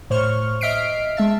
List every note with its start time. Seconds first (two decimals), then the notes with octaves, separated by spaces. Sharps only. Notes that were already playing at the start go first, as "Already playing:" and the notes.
0.10 A2 C5 C#5 C#6 F6
0.61 D#5 E5 F6 B6 C7 D7
1.17 G#3 E5 A5